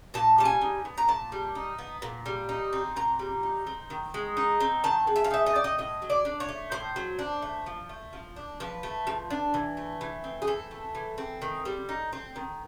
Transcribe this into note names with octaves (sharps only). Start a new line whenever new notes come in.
A#2 A5
G3 A5
G#5
D#4
B3
A#5
A#2 A5
G3
D#4
B3
A#2
G3
D#4
C4
A#2 A#5
G3
D#4
C4
D#3
G#3
D#4
C4
D#3 A5
G#3
E5
F5
D#4 E5
D#5
C4 D5
D#5
A2 D#5
F#3
D5
D4
C#5
A3
A2 C5
F#3
D4
A3
F3
A3
F3
D4
F3 B4
A3
F3
D4
E3
A3
E3
C4
G#4
E3 A4
A3
E3
C4
D#3
G3
D#4
C4
D#3